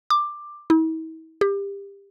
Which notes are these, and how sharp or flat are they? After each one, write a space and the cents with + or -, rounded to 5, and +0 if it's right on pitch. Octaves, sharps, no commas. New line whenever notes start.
D6 +10
E4 -45
G4 +25